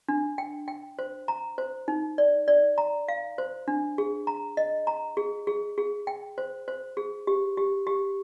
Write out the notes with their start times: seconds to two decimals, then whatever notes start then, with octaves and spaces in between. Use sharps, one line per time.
0.09 D4
0.38 G5
0.68 G5
0.99 C5
1.28 A#5
1.58 C5
1.88 D#4
2.18 D5
2.48 D5
2.78 A#5
3.08 F5
3.38 C5
3.68 D4
3.98 G#4
4.27 A#5
4.57 D#5
4.87 A#5
5.17 G#4
5.47 G#4
5.78 G#4
6.07 G5
6.38 C5
6.68 C5
6.97 G#4
7.27 G4
7.57 G4
7.87 G4